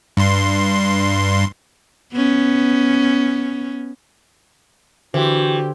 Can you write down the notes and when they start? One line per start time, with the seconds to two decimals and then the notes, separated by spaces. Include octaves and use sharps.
0.17 G2 C6
2.13 B3 C#4
5.14 D3 E3 F#4 G4 C5